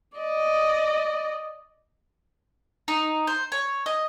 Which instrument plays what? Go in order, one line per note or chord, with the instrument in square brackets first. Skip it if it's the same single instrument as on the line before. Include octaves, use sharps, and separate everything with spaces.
[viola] D5 D#5
[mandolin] D#4
C5
C#5
D#5